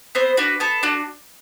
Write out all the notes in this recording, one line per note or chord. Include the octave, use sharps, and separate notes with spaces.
B3 C4 C5
D4 F#4 B4
B3 A4
D4 F#4